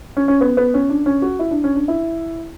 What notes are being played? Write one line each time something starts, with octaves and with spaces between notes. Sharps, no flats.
C#4
C#4
B3
B3
C#4
D4
C#4
F#4
E4
D4
C#4
D4
E4